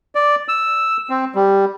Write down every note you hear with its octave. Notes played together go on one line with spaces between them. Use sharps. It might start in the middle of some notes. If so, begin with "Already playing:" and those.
D5
E6
C4
G3